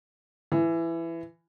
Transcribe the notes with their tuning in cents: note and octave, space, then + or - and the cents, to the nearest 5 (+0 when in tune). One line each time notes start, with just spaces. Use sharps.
E3 +15